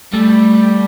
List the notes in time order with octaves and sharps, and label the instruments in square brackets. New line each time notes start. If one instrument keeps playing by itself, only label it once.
[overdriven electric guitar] G3 [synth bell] A3